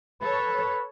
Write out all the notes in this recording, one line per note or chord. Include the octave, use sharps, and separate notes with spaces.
A4 B4 C#5